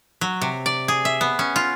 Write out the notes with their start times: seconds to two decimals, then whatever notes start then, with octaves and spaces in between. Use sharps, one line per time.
0.21 F#3
0.41 C3
0.66 D5
0.88 G#4
1.05 E5
1.21 B3
1.39 C#4
1.56 F4